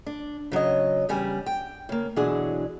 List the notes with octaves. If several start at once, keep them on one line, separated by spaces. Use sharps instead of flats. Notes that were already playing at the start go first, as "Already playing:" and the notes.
D4
C#3 F#3 C#5 D#5
E2 C#3 G3 G#5
G5
C#3 A#3
B2 D3 E3 F#3 D4 G#4